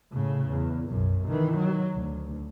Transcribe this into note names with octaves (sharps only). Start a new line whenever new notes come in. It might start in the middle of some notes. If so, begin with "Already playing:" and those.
A2 C#3
E2
B1 F#2
D#3 E3
F#3
D2